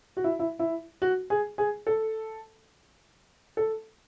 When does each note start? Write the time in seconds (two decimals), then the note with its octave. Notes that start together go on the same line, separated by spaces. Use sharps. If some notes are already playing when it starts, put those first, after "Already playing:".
0.17 F#4
0.24 E4
0.39 E4
0.59 E4
1.02 F#4
1.30 G#4
1.58 G#4
1.87 A4
3.57 A4